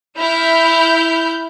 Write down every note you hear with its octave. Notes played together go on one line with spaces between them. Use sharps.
E4 F6 G6